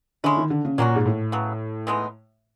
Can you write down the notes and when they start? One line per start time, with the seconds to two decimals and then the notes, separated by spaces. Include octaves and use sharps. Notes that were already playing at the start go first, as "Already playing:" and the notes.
0.24 D3 G#3 C#4 E4
0.37 D#3
0.50 D3
0.65 C#3
0.78 A#2 F#3 A#3 C#4 F#4
0.96 G#2
1.05 A2
1.32 C#3 F#3 B3
1.87 E3 G#3 B3 D#4